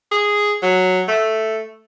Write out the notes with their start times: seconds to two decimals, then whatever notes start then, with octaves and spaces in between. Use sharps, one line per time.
0.11 G#4
0.62 F#3
1.08 A3